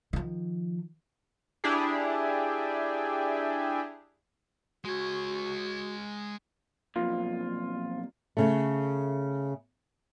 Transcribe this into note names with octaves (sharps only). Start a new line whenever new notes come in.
D#3 F3
D4 E4 G4 G#4
G#3 F#4 C#5
B1 F2 A#2 F4
C#3 A3